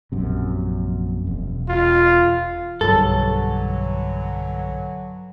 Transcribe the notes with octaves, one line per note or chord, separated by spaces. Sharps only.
A#1 F#2 C3
E1
F4
B1 G2 D3 E3 F#3 A4